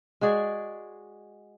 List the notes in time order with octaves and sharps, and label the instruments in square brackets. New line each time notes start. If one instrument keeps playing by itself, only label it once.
[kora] G#3 F#4 G#4 D5